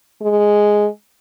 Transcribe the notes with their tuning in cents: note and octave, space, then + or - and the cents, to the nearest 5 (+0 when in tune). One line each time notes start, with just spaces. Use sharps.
G#3 +0